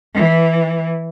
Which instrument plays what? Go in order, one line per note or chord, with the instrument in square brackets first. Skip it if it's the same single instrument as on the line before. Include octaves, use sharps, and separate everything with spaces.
[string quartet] E3